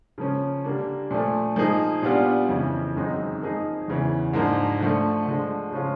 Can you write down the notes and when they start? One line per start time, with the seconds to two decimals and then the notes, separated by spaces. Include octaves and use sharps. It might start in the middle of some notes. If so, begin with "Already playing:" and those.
0.18 C#3 F3 A#3 C#4
0.64 D3 G3 A#3 D4
1.10 A#2 F3 A3
1.56 F3 A#3 D#4 G#4
2.02 A#2 G3 B3 D4 F4
2.49 F2 C#3 E3
2.96 F#2 D#3 G#3 C4 D#4
3.42 F3 A#3 D#4 G#4
3.88 E2 C#3 E3
4.33 G#2 F3 A#3 D4
4.80 D3 F3 A3
5.27 D3 F3 G#3
5.72 C#3 F3 G#3 C#4 F4